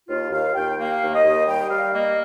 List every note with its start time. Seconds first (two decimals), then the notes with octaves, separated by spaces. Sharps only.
0.08 D#2 F4
0.32 D#2 F5
0.55 D#2 G5
0.78 A#3 F5
1.01 D#2
1.13 D#5
1.24 D#2
1.47 G3 G5
1.70 G3 F5
1.94 A#3 D#5